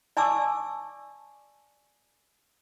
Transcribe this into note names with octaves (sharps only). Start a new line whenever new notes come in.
D5 G#5 A5 C#6 D6 E6